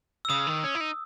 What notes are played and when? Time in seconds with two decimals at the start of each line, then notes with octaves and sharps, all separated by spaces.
0.25 E6
0.30 C#3 D#6
0.47 D#3
0.64 C#4
0.75 E4
0.80 D#4